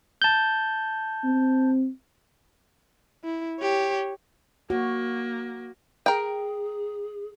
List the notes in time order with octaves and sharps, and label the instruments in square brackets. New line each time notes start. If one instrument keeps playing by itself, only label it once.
[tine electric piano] A5 G6
[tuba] C4
[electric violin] E4
G4 C#5
[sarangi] A#3 [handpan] F#4
[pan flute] G#4 [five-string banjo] A#4 G5